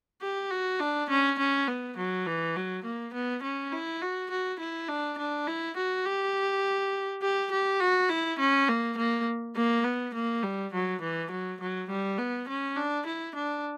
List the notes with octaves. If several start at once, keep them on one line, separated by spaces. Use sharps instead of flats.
G4
F#4
D4
C#4
C#4
B3
F#3
E3
F#3
A#3
B3
C#4
E4
F#4
F#4
E4
D4
D4
E4
F#4
G4
G4
G4
F#4
E4
C#4
A#3
A#3
A#3
B3
A#3
G3
F#3
E3
F#3
F#3
G3
B3
C#4
D4
E4
D4